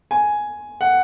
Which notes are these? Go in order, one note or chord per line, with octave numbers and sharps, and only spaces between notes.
G#5
F#5